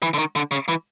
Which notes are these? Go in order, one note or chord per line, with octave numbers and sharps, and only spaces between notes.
E3
D3
D#3
D3
C#3
E3